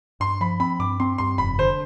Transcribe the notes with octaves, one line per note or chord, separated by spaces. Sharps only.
G2 C6
F3 B5
C4 B5
G2 D6
C4 C6
G2 C6
F1 B5
D3 C5